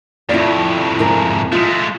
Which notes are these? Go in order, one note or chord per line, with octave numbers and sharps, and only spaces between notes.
F2 A2 E4 F4 D5
G#2 E4 A#4
G#3 A3 F4